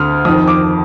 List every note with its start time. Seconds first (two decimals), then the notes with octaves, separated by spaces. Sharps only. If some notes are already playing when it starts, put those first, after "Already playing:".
Already playing: D2 D3 D#6 F6
0.25 F2 D#3 D#6
0.47 D6